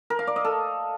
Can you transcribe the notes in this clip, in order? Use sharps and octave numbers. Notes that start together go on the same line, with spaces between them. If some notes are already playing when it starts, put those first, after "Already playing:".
A#4
F5
D5
D#5
A4